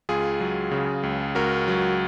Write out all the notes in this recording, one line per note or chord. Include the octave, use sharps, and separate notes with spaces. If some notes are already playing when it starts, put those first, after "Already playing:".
C#2 F4 G#4
F#3
C#3
C#2
C#2 F#4 A#4
F#3